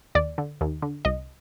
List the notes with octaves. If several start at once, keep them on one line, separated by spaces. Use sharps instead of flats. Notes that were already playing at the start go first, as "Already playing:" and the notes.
D#2 D5
D3
D#2
D3
C2 D#5